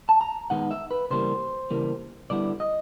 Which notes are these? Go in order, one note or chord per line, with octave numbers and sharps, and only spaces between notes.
A5
A#5
D#3 G#3 B3 D#4 F#5
E5
B4
C#3 E3 G3 A#3 C5
C#3 E3 G3 A#3
D3 G3 B3 E4 D5
D#5